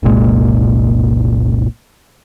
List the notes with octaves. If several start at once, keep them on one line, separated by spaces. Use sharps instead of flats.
F#1 C2 A#2 G#3